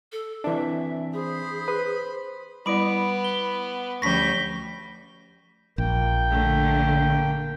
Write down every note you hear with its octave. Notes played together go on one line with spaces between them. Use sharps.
A4
E3 C4 D4 E5
G#4 C5 B5
B4
G3 B3 E4 D5 B5 D6 D7
G7
D2 F3 G3 C#4 C#6 G6 A#6 B6
A#1 A#3 G5
D3 A3